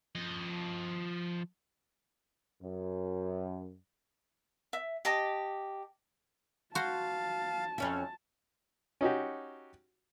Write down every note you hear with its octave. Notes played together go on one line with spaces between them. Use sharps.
F3 D#5
F#2
E5
G4 D#5 A5 D6
F#4 C5 F5 A5
F2 C#4 E5
C#4 D#4 F#4 G4